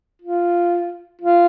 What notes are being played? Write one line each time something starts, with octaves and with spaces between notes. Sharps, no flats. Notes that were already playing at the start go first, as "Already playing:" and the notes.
F4
F4